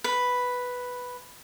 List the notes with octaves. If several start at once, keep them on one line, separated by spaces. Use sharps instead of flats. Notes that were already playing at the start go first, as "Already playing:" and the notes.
B4